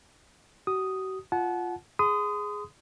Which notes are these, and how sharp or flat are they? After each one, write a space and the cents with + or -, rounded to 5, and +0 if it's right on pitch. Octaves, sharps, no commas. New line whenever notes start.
F#4 +40 D#6 +0
F4 +0 F#5 +0 A5 -35
G#4 +0 C6 -40 D#6 +0